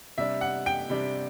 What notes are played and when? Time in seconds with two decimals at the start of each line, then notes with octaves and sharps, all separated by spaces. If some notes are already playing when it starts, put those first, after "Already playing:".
0.18 C3 G3 D4 E5
0.41 F#5
0.66 G5
0.90 C3 G3 D4